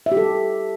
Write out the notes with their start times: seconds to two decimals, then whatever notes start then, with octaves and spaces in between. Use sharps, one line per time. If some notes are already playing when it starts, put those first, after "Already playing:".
0.06 E5
0.12 G4
0.17 A4